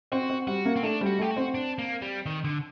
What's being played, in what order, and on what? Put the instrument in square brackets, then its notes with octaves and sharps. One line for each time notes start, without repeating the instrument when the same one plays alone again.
[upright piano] C4 [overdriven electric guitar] F#4
[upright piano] C4
[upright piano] G3 [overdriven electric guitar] F#4
[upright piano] A#3
[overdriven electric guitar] C4
[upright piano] A3 [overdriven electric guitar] D4
[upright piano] G3
[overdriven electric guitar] F#4
[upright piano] A3 [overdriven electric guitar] G4
[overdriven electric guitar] F#4
[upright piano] C4
[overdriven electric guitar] D4
A#3
G3
D#3
D3